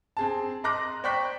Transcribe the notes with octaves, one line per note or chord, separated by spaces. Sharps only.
C4 G#4 A5
D#5 A#5 C6 D6 F#6 A#6
C5 D5 G5 C#6 F#6 B6